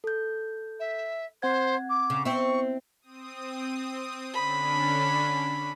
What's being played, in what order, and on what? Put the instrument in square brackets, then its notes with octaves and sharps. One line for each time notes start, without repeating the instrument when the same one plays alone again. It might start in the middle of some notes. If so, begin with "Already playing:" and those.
[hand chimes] A4 G6
[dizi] E5
[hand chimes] C4 F#5 G#6 [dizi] C5
[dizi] D6
[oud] C#3
[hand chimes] B3 [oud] C4 E4 [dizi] C#6
[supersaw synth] C4 D#6
[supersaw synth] D3 C#4 D4 [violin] B5